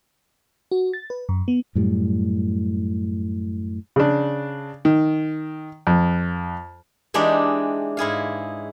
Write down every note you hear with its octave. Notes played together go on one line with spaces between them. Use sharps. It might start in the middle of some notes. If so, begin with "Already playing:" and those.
F#4
A6
B4
F#2
B3
F#2 A2 G3
C#3 D4
D#3
F2
E3 G#3 D4 D#4 G4
G#2 E4 G#4 F5